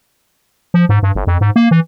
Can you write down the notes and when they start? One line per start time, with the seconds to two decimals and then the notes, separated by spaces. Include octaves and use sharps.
0.74 F3
0.89 G#2
1.03 G2
1.15 G1
1.27 F2
1.41 G#2
1.56 A#3
1.71 E3